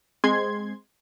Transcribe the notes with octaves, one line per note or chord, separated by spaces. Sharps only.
G#3 C4 C6 G#6